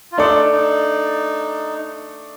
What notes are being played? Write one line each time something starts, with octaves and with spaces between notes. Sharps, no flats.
F4
A3 D4 D#4 A4 D5
D#4